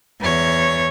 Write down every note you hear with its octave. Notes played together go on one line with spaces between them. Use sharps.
E2 C#5